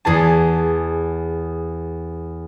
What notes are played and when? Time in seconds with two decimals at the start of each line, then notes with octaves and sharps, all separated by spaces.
0.05 E2 G#4 B4 A5